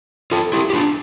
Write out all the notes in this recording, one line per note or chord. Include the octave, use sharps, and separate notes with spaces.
F4 A4
E4 G4
G4
D4 F4